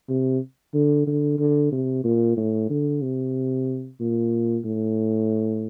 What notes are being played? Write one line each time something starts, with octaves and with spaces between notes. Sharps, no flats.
C3
D3
D3
D3
C3
A#2
A2
D3
C3
A#2
A2